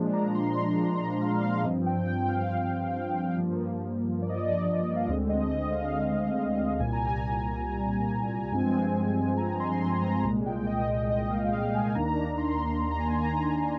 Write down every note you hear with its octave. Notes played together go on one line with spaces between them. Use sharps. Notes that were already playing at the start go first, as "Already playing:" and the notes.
Already playing: A#2 F3 G#3 D4
A#5
C6
A#5
A#5
A#5
F5
F5
G2 F3 C4 D#5
G5
G5
F5
G2 F3 A#3
D5
D#5
D5
F5
D2 D3 G#3 C4 D#5
D#5
D#5
F5
C2 A#2 G3 G#5
A#5
G#5
G2 F3 G#3 C4 G#5
A#5
C6
A#5
A#5
C2 A#2 G#3 A#5
G5
D#5
D#5
D#5
F5
F5
G#5
D#2 D#3 A#3 D4 A#5
C6
C6
A#5
G#5
A#5
A#5